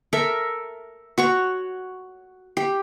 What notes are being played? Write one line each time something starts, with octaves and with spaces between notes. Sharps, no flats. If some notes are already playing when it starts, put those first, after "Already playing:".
A4 A#4 E5
F#4 C#5 C#6
G4